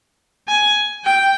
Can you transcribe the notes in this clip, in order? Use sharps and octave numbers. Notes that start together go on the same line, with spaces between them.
G#5
G5